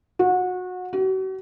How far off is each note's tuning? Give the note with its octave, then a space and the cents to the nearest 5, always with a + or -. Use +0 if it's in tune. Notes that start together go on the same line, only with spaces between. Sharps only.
F#4 -25
F#4 +40